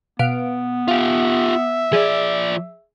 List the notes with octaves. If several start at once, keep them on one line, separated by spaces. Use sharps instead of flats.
B2 B3 F5 D7
F4 G4 E5 F5
F3 G#4 D5